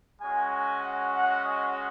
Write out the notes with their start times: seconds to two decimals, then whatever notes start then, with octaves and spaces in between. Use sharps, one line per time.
0.21 G#3 C#4 F#4 G#5
0.52 G#5
0.82 F#5
1.13 F#5
1.43 D#5